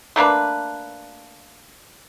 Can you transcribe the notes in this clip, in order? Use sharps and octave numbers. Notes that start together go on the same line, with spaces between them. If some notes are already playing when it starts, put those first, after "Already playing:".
A3 A#3 D4 B4